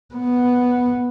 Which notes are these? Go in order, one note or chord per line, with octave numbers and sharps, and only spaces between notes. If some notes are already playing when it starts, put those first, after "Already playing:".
B3